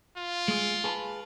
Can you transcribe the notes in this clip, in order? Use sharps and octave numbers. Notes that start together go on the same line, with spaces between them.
F4
G#3 G#4
G#4 B4 A5